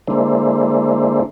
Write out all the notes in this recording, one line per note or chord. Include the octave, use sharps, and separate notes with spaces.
D3 G#3 A#3 D4 E4 C5